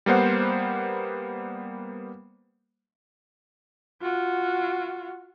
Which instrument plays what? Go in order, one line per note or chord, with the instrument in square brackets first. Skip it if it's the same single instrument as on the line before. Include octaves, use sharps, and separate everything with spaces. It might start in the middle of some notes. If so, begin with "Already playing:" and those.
[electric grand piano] G3 A#3 B3 C5 F#5
[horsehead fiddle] F4 F#4